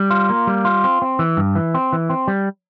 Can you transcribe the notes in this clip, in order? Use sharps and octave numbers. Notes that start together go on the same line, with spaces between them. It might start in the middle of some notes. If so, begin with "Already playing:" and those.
Already playing: G3
F4
A#3
G3
F4
C4
C4
E3
G2
E3
C4
E3
C4
G3